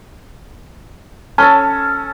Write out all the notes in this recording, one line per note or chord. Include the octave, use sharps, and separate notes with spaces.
C#4 A4 A5 C#6